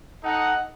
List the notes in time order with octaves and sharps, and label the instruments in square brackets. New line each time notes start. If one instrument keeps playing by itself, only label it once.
[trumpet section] D#4 A4 D#5 F#5